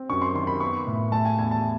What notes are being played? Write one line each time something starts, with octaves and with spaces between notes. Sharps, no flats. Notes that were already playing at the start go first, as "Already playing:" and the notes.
Already playing: C4
F#2 C#6
C6
D#3 C6
B5
B3 C#6
A2
A3 A5
G#5
E2 G#5
A5